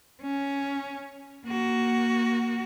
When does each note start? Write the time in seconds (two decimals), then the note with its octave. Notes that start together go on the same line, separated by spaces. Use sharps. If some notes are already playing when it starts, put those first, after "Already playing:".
0.22 C#4
1.46 A#3 F#4